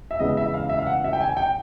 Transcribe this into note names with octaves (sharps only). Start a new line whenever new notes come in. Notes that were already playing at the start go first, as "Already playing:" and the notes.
E5
C#3 E3 G#3 B3 D#5
E5
F5
E5
F5
F#5
E5
G5
G#5
G5